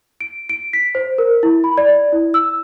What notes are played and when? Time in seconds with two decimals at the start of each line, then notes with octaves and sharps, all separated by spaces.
0.21 D7
0.49 D7
0.73 B6
0.95 C5
1.18 A#4
1.43 E4
1.64 B5
1.78 D5
2.13 E4
2.34 E6